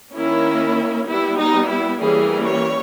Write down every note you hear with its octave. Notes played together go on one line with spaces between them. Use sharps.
D#3 A#3 C#4 E4
G3 B3 E4
D#4
E4
E3 G3 A#3 C#4 G#4
C#5